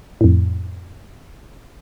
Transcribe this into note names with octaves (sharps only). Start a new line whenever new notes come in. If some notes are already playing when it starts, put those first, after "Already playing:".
F2 A2